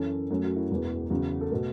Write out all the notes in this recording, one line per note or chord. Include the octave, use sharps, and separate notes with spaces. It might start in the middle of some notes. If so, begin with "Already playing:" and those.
Already playing: F#2 E3 C#4 A4
F#2 F#3 A3 C#4 F#4
F#4
E4
E1 E2 E3 B3
E2 C#3 F#3 F#4
A4
B2 A3 B4